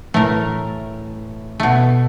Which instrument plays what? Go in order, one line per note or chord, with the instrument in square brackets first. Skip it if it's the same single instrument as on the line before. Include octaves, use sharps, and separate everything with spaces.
[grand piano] A2 E3 [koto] A3 A#4
[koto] B2 A3